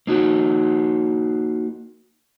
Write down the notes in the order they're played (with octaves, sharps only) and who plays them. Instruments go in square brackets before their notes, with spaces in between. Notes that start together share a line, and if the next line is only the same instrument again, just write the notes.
[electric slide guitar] A#3 D#4 F#4